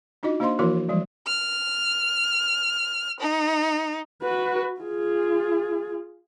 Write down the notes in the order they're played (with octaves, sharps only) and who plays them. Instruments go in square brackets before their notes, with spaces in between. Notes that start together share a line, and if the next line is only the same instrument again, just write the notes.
[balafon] D4 D#4 F4 F#4 D#5
A#3 D4 C5 D#5 F5 C6
E3 F3 A#3 E4 F#4 A#4
E3 F3 G3 G#3
[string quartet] F6
D#4
[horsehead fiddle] F#4 B4
F4 G#4